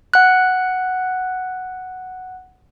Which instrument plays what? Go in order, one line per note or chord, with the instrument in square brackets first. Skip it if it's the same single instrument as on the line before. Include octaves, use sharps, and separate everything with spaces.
[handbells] F#5 F#6